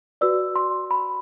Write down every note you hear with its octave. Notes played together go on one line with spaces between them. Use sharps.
F#4 B4 D5 E6
C6
B5